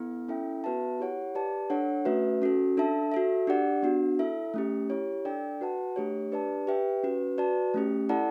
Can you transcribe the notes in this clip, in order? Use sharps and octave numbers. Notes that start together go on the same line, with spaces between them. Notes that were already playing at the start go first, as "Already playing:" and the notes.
Already playing: B3 E4 A4
C#4 E4 A4 E5 G5
B3 F#4 B4 E5 A5
E4 G4 C#5 F#5
G4 B4 D5 A5
D4 A4 C#5 F#5
A3 C#4 F#4 B4 E5
C#4 F#4 A4
D4 A4 E5 A5
F#4 A4 E5
D4 G4 D5 F#5
B3 D4 F#4
E4 A4 E5
A3 C#4 G4
E4 G4 C#5
D4 A4 D5 G5
F#4 B4 F#5 A5
A3 D4 G4 C#5
D4 G4 B4 D5 A5
G4 B4 E5 G5
C#4 F#4 B4
F#4 B4 D5 A5
A3 C#4 G4
E4 A4 D5 F#5 A5